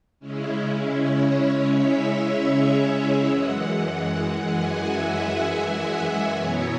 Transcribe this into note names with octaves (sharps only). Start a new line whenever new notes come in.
C#3 G#3 C#4 E4
C#5
E5
E5
F#2 E3 G#3 F#5
F#5
G#5
E5
B2 F#3 B3 E4 C#5